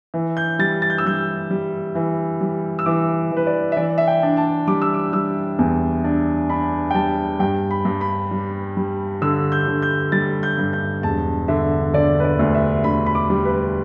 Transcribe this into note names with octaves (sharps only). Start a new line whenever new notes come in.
E3
G6
G3 A6
A6
G6
E6
G3 G6
G3
E3
G3
E6
E3 D6
E3 B4
D5
E5
E3 D5
E5
G5
D4
A5
G3 D6
E6
D6
G3 E6
E2
D4
D4 B5
G5
G3 A5
G2 G5
B5
G2
B5
G3
G3
D3 E6
G6
D3
G6
G3 A6
G6
G2
G6
E1 A5
D3 E5
D3 D5
B4
D5
D2
E5
D2 B5
B5
D6
G3
B4